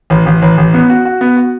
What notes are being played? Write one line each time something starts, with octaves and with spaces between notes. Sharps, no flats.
A1
A1
A1
A1
B3
F#4
F#4
B3
F#4